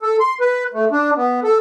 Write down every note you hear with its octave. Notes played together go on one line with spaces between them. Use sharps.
A4
C6
B4
A3
D4
B3
A4